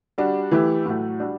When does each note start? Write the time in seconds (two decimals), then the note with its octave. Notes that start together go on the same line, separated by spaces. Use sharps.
0.18 G3 D4 F#4
0.51 E3 A3 E4 G4
0.86 A2 F#3 A3
1.19 G3 D4 F#4